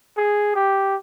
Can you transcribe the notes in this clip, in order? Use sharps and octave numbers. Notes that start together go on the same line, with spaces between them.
G#4
G4